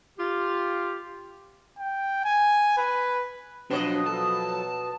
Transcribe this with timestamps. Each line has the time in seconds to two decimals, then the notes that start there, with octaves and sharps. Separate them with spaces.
0.17 F4 G4
1.79 G5
2.24 G#5
2.77 B4
3.71 B2 F3 F#3 D4 C#5 D#5
4.07 F3 F#3 A4 A5